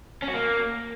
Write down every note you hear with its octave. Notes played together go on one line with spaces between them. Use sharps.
C#4
F#4
A#3